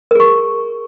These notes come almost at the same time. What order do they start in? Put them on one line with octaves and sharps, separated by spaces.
A#4 G#4 C#6